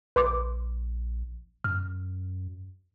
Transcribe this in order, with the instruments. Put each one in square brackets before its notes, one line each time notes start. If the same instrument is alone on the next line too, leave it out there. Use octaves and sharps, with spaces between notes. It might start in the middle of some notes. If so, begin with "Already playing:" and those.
[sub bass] A#1 [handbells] B4 C6 D6
[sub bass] F#2 [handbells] F6